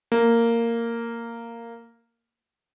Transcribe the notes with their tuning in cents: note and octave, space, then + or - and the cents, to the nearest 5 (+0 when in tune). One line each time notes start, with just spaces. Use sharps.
A#3 -10